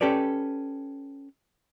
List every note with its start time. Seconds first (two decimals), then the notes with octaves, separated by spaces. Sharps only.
0.01 C#4 G4 A4 B4 D5